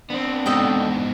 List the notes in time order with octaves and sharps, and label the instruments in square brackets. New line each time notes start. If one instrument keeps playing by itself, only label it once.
[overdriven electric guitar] B3 C4 [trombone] D4
[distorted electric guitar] G#2 B2 [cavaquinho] A4 D#5 G5